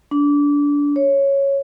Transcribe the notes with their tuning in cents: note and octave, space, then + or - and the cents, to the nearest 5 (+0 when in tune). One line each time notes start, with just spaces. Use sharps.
D4 -25
C#5 -5